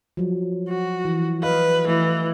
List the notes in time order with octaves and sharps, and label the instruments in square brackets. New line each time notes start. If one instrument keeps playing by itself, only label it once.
[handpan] F3 F#3
[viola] F#4
[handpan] E3
[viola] B4 [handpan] D#5 F5
[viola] E3 [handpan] A3